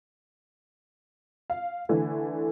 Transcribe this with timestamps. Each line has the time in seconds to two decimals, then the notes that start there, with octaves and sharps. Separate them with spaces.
1.50 F5
1.89 D3 E3 A3